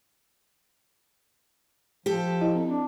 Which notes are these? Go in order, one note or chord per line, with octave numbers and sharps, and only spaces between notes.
F3 G4 A4
E4 D#5
C4
D4